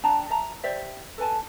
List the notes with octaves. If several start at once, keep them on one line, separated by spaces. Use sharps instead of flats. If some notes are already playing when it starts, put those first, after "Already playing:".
D4 G5 A5 A#5
E5 A5 A#5
G4 C5 D5 E5
A4 B4 G#5 A5